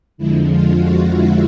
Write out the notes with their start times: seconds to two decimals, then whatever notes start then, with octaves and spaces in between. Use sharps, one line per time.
0.18 F2 D3 F3 G#3 E4
0.47 F4
0.76 F#4
1.05 E4